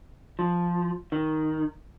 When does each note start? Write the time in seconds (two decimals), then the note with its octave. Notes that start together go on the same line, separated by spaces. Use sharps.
0.39 F3
1.12 D#3